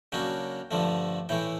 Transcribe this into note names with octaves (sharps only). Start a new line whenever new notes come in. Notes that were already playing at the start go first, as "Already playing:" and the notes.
C#3 F#3 A#3 D4 G5
G2 D3 F3 A3
A2 E3 A3 G5